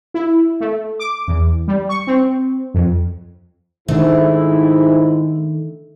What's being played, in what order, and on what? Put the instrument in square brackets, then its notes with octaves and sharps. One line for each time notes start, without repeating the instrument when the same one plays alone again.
[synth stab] E4
A3
D6
E2
G3
C#6
C4
F2
[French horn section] G#2 [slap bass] D#3 D4 [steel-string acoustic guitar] A3 [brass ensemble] E4